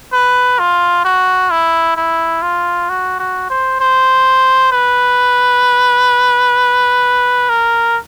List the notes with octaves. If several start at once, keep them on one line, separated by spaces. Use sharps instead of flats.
B4
F4
F#4
E4
E4
F4
F#4
F#4
C5
C5
B4
A#4